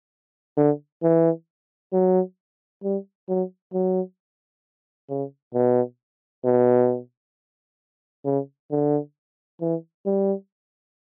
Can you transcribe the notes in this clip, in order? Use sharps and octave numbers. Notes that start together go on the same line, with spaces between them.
D3
E3
F#3
G3
F#3
F#3
C#3
B2
B2
C#3
D3
E3
G3